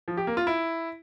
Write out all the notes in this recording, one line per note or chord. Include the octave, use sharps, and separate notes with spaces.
F3
G4
A#3
F4
E4